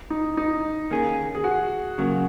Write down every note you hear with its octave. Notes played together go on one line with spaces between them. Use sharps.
D#4
D#4
D#3 A#3 C#4 G#4
G#4
F#4
C#3 F#3 A#3 F#4